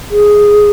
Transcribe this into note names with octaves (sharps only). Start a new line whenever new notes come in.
G#4